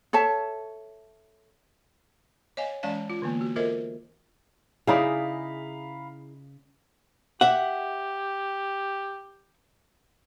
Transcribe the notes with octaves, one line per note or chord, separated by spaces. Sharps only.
A4 C#5 E5 A5
C#5 D#5 F5 G#5
E3 G#3 C#4 D5 F5 A5
F4
D3 E3 A#3 B3
F#4
F4 A4 A#4 C5 D#5 E5
C#3 D#4 E4 G#4 D5 F5 A#5 B5
G4 E5 F#5